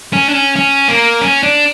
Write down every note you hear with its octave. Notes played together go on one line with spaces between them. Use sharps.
C#4
D4
C#4
C#4
A#3
C#4
D4